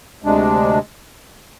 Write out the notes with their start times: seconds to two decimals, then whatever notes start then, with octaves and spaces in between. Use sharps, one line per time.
0.22 D2 C3 G#3 D4